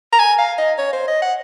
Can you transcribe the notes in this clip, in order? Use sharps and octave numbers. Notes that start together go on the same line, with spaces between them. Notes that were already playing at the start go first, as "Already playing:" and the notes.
A#5
G#5
F5
D#5
C#5
C5
D#5
F#5